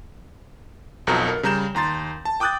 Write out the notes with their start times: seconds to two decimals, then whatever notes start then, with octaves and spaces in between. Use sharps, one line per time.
1.07 B1 F2 B2 A4 A#5
1.28 A#4
1.43 C#3 G3 A#5 G6 E7
1.75 D#2 A#5 C6 A6
2.25 A5
2.40 G5 D6 D#6 F#6 G6 A6